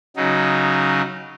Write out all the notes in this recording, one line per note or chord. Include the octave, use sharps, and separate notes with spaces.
C#3 F#3 D#4